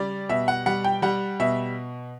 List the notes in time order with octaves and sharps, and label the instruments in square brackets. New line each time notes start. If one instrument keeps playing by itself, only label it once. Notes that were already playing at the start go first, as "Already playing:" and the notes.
Already playing: [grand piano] C#3 G3 D5
B2 E5
F#5
G3 F#5
G5
G3 F#5
B2 E5